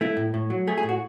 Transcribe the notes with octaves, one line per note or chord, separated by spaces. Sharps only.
A3 E4
A2
A2
F#3
A3 G#4
G#4
A2
F#4